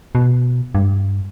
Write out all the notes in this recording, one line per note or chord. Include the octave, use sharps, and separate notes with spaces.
B2
G2